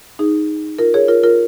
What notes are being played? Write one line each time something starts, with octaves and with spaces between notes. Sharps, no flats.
D#4 G#4
F4 A#4
G#4 C#5
F4 A#4
F4 A#4